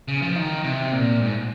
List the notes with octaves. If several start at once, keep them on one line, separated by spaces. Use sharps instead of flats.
C#3
F3
D#3
C3
A#2
G#2